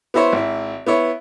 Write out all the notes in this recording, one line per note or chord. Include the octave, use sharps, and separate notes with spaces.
B3 E4 C5 C#5
G#1 E4
B3 E4 C#5